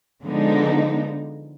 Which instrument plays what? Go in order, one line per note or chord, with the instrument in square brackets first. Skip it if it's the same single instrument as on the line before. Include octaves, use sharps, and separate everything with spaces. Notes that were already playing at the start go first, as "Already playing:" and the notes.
[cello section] D3 F3 G#3 B3 D#4